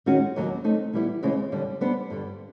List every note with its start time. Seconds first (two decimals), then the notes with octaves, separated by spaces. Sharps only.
0.06 D#3 G#3 C#4 F#4
0.36 D#2 C#3 F#3 A#3
0.64 A3 C4 D#4
0.93 E3 G3 B3 E4
1.23 D#2 C#3 E3 G#3 C4
1.52 D#2 D3 G3
1.81 G3 B3 D4 G4 C5
2.10 G2 D3 G3